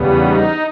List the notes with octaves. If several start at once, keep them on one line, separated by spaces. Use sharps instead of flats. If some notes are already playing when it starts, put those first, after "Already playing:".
Already playing: E2 C#3 G3 B3
D#4